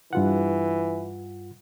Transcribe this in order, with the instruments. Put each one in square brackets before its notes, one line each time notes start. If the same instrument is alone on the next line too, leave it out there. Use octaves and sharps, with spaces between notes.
[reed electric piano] G2 F4 F#5 [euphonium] E3